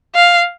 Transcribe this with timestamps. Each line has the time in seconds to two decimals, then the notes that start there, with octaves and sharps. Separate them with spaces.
0.15 F5